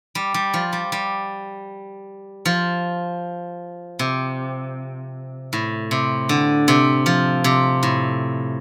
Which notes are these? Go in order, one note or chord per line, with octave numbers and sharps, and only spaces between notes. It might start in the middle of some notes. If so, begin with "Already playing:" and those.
G3
G3
F3
G3
G3
F3
C3
A2
C3
D3
C3
F3
C3
A2